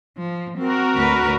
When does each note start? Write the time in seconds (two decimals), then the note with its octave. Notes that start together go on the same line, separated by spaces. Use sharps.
0.18 F3
0.59 C4 F#4 A#4
0.95 D2 B4